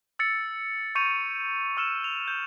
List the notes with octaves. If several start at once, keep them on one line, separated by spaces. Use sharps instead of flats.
E6 A6 C#7
C#6 G6 C#7 D#7 F7
C#6 E6 F6 C#7 E7
F7
G6